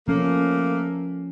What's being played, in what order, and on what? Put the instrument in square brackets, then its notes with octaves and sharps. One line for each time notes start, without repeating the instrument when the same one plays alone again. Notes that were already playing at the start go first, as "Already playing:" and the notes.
[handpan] F3 C#4 [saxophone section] A3 A#3